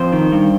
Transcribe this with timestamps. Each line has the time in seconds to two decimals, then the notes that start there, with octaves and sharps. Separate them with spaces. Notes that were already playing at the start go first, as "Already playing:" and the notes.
Already playing: F2 C5
0.13 D#3
0.32 G2